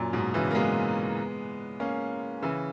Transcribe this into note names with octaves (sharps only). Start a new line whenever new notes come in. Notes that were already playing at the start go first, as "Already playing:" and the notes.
Already playing: F#2 A#2
G#2 B2
C#3 E3
A#3
G#3 B3
A#3 C#4
C#3 E3